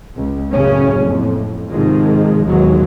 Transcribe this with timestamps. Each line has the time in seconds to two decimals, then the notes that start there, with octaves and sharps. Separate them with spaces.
0.17 C#2
0.52 F#1 A2 C#3 C#4
1.00 F2 A2
1.70 G#2 C3 D#3 F3 G#3
2.44 D#2 G#2 B2 E3 F#3 G#3